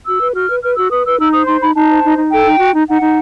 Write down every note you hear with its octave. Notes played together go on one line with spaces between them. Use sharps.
F#4 E6
B4
F#4 F6
B4
B4 F6
F#4 E6
B4 D#6
B4 E6
D#4 E6
C5 D#6
D#4 C6
D#4 B5
D#4 A5
C5
D#4
D#4
A4 G5
D#4
F#4
D#4
D#4 F#5
D#4